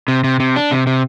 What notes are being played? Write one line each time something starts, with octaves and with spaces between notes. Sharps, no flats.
C3
C3
C3
D4
C3
C3